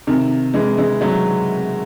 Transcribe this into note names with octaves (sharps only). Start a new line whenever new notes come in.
C3 D#3
E3 G#3
E3 G#3
F#3 A3